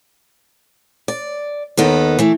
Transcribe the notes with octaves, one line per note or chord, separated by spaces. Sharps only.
D5
D#2 D#3 B3 A4
E3 A3